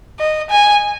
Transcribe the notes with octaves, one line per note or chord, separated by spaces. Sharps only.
D#5
G#5